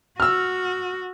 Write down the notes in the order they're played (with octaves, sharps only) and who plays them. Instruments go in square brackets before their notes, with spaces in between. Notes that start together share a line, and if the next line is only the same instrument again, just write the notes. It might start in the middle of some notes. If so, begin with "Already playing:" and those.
[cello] F#4 [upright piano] E6 F6